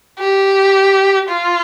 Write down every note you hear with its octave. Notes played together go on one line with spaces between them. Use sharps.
G4
F4